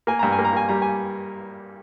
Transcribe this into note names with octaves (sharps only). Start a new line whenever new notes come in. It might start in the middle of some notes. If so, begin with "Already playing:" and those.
A#3 G#5
G2 A#5
G#5
A#3
A#5
A#3 G#5
G3 A#5
G#5